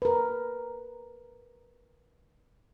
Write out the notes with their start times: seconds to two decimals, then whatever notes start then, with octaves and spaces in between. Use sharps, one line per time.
0.02 A#4 B4